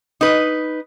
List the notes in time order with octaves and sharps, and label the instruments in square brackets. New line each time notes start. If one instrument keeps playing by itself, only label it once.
[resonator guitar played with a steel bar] D#4 B4